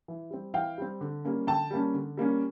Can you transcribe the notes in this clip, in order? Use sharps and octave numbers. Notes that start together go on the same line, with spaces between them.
E3
G3 C4
E3 F5 G5
G3 C4
D3
G3 A#3 C#4
D3 G5 A5
G3 A#3 C#4
D3
G3 A#3 C#4